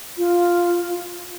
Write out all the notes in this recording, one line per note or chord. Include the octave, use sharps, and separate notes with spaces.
F4